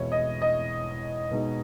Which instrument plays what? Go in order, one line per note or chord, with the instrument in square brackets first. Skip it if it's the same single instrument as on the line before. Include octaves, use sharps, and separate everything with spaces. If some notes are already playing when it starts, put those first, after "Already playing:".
Already playing: [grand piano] E2 B2 G#3 B3 E4 [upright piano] C#5
[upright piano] D#5
D#5
[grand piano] B2 G#3 D#4